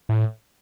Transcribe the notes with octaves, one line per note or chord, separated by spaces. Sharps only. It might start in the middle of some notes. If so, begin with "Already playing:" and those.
A2